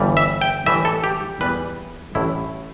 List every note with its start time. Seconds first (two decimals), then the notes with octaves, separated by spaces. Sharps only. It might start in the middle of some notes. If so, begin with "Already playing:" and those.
Already playing: G1 G2 E3 G3
0.17 E5
0.41 G5
0.66 A2 E3 G3 E5
0.85 A4
1.04 G4
1.41 E2 E3 G3 B3 B4
2.15 A1 A2 G3 E4